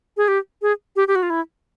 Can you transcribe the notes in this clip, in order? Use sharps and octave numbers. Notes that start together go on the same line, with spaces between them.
G#4
G4
G#4
G4
G4
F#4
F4
E4